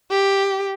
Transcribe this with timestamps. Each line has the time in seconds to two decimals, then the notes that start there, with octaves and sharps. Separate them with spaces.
0.10 G4